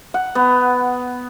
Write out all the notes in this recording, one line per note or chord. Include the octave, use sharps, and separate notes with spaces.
F#5
B3